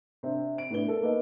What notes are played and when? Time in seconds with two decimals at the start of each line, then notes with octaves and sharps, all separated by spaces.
0.23 C3 C4 D4
0.58 D7
0.70 A2 A3 B3 D4 G7
0.86 A4 A#4
1.02 A#3 B3 D#4